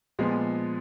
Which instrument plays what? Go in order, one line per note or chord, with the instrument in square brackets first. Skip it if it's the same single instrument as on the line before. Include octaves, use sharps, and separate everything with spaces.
[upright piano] A#2 F3 G#3 B3